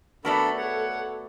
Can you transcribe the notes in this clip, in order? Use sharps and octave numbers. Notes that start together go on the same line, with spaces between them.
A3 B3 D4 F#4 A4 A#4 D5 B5
A4 C#5 F#5